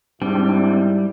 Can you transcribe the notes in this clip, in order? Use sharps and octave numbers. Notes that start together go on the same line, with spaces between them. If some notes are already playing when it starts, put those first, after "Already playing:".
G#2 G3 C4 D4 E4